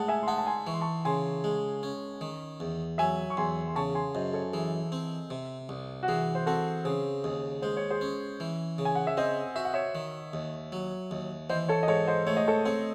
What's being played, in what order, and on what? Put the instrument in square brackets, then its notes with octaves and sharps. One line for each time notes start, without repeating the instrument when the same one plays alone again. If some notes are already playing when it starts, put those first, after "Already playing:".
Already playing: [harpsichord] A2 G#3 [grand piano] F#5 A5
[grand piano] E5 G#5
C6
[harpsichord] D#4 [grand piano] F#5 A5
[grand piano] A5
G#5 C6
[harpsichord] E3 [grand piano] C#6
[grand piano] C6
A5 C#6
[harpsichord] C#3 [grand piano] G#5 C6
[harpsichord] G#3
C#4
D#3
E2
[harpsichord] F#3 [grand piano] E5 G#5
[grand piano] C#6
[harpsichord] E2 [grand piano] G#5 C6
[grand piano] C6
[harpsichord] C#3 [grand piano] A5 C#6
[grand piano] G#5 C6
[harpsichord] F#2 [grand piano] C5 D#5
[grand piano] A4 C#5
[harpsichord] E3 [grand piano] G#4
[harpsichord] C4
C3
C2
[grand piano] F#4
[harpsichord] E3 [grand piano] G#4
[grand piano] C5
[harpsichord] C4 [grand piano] F#4 A4
[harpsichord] C#3 [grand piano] G#4 C5
[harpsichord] D#2 [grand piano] G#4
[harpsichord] G#3 [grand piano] C5
[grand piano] C#5
G#4 C5
[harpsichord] C#4
E3
C#3
[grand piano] G#5
F#5
E5
[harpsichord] C4 [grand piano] C5 D#5
[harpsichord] F#4 [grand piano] E5
[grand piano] F#5
C#5 E5
[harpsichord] D#3
D#2
F#3
D#2
[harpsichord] E3 [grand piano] C5 D#5
[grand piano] A4 C#5
D#5
[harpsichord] G#2 [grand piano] A4 C#5
[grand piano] C5 D#5
[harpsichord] A3 [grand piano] C#5
[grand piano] D#5
A4 C#5
[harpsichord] C4 [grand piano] A4 C#5